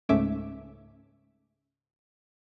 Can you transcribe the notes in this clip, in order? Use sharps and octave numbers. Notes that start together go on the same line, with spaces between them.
C#2 G#2 A3 C#4 E5 D6